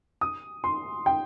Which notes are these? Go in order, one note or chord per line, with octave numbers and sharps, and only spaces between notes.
D#6
C6
G5